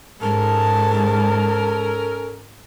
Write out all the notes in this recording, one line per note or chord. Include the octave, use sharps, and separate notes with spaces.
G#2 G#3 C#4 A4 A#4 A5